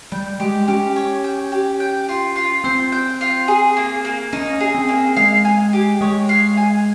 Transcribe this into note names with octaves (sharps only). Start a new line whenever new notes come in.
G3 G5
G#3 G4
C#4 G4
C#5
G5
G4
G5
F4
F4
C4 C5
G5
F4
G#4
A#3
A#3
C#4 D#4
G#4
C4
A#3
G#3 F5
G#5
G4
G#3 C#5
F5
G#5